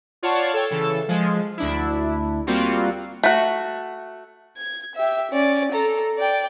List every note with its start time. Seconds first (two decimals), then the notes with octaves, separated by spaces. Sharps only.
0.23 F4 C#5 D5 F#5 A5 C#6
0.53 A4 C#5 G5
0.71 C#3 E3 A4
1.08 F3 G#3
1.57 D2 D4 E4
2.47 G3 A#3 C4 F4 F#4
3.23 A3 F#4
4.57 G#6
4.95 G4 E5
5.31 C#4 D5
5.72 A4 A#5
6.19 D5 G5